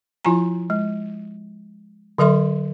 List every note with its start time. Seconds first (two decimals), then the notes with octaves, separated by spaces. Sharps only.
0.25 F3 E4 F4 G#5 A#5
0.70 G#3
2.18 D3 F#3 A4 E5 C6